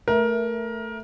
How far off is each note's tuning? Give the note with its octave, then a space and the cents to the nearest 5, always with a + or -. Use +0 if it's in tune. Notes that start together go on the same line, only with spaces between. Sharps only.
A3 +10 A#4 +20 E5 +0